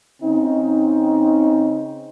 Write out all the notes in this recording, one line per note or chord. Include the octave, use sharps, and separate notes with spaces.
C#3 C4 D#4